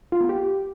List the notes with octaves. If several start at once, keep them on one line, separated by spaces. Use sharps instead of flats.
F4
B3
G4